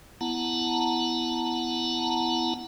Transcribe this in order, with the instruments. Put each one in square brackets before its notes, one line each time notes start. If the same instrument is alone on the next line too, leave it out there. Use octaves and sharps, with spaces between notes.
[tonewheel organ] B3 E4 F#5 A5 A#5